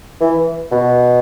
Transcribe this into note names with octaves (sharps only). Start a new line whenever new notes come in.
E3
B2